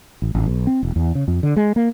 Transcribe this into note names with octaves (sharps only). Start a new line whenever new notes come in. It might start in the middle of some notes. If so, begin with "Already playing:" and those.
A1
A1
B1
C4
E1
E2
C#3
F2
D3
G#3
A#3